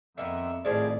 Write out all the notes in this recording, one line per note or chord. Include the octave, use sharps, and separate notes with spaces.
F2 D#3 A#3 B3 E5
G#1 A2 D#3 F3 G3 G#4 D5